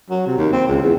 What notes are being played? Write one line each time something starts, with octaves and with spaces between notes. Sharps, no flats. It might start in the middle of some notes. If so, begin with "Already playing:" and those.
F#3
C3
D#2
C4
C#2
E2